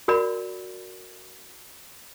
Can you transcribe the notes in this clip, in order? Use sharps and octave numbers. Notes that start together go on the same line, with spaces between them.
F#4 A#4 D5 B5